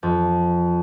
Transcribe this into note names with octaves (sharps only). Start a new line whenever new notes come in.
F2